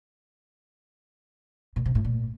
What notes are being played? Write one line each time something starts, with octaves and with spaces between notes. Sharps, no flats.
A#2
C3
A2
A#2